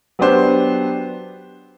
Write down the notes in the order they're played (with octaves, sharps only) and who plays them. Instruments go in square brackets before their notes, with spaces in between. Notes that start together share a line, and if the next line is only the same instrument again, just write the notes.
[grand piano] F#3 B3 D4 G4 C5